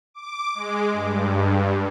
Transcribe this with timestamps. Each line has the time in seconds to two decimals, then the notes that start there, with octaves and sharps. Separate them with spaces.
0.14 D6
0.55 G#3
0.93 G2